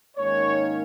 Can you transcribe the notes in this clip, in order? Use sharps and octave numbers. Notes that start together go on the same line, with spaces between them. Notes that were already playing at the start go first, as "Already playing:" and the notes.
G#2 D#3 A#3 C#4 C#5